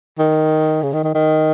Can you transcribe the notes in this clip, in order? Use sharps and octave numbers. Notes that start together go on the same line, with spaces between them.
D#3
C#3
D#3
D#3
D#3